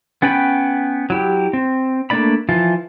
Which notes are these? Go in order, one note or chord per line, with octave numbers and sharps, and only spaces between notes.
B3 C#4 B4 G5 B5
F#3 E4 G4
C4
A3 A#3 D4 D5 B5
E3 F3 F4